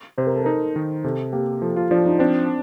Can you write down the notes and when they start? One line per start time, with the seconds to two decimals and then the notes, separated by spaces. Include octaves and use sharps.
0.18 C3 C5
0.27 A#4
0.35 A4
0.44 D#4 A#4
0.76 D#3
1.04 C3 A4
1.32 A#3 G4
1.62 F3 A4
1.76 F4
1.91 F3 D4
2.05 D#4
2.19 C4 D4